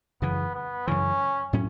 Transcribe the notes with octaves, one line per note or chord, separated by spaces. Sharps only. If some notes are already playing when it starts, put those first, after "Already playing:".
F#2 C#3 E3 B3
B3
F#2 C#3 E3 C#4
A2 F#3 C#4